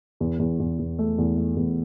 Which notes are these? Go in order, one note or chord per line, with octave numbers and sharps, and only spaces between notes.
E2
E2
E2
E2
A3
E2
A3
E2